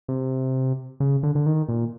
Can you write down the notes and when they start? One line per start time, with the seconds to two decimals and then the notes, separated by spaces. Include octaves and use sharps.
0.08 C3
1.00 C#3
1.23 D3
1.35 D3
1.46 D#3
1.69 A#2